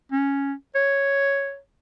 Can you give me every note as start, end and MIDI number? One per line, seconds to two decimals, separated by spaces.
0.12 0.53 61
0.75 1.58 73